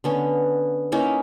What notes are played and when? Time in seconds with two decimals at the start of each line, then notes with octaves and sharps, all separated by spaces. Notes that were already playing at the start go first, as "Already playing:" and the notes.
0.04 D3 B3 C#4
0.92 A#3 C#4 D#4 E4